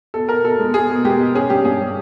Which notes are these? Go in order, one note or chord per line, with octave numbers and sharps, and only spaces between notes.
B2 A4
B2 A#4
B2 A4
G#3
B2 G#4
B2
G#3 G4
B2
C#4 G#4
G2 G4
G2 G#4
C#4